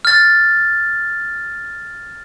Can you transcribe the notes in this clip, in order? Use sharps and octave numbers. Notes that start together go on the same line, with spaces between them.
F6 A6